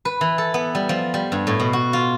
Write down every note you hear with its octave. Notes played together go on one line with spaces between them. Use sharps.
B4
E3
A4
B3
G3
F3
G3
G2
A2
B2
F#4
F4